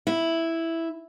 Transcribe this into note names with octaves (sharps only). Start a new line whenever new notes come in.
E4